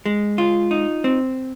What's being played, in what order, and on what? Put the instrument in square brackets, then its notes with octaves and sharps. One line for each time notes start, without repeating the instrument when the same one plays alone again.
[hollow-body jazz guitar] G#3
F4
D#4
C4